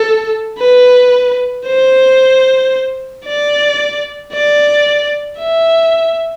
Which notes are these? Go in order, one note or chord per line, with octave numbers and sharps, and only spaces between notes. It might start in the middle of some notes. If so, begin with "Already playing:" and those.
Already playing: A4
B4
C5
D5
D5
E5